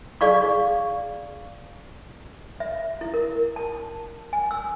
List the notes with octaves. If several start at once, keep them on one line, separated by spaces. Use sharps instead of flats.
G#4 D5 F5 C#6
E5
E4
A#4
A5
G#5
E6